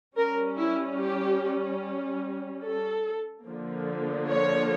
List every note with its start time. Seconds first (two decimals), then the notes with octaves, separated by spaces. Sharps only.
0.16 G3 C#4 A#4
0.57 E4
0.98 G4
2.63 A4
3.46 D3 F3 A#3
4.28 C#5